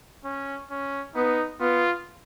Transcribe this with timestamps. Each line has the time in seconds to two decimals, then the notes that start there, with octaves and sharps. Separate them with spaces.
0.25 C#4
0.71 C#4
1.15 B3 D#4
1.60 B3 F4